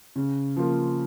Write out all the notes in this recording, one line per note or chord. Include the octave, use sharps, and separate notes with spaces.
C#3
F3 A#3 F4